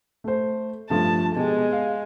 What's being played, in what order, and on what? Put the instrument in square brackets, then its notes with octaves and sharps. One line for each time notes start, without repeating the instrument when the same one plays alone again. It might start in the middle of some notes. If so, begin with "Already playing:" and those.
[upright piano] A3 C5
[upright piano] G2 F3 A3 [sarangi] A5
[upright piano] B2 G4 [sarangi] G#3
[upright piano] F5